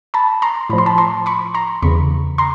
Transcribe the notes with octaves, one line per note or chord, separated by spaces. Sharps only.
A5 B5
A#5 C6
A2 F3 B5
C6
A5 B5
A#5 C6
B5 C#6
A#5 C6
E2 C#3 E3 B5 C#6
A#5 C6